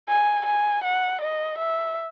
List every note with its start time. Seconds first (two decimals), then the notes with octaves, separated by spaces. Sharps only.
0.09 G#5
0.46 G#5
0.84 F#5
1.21 D#5
1.58 E5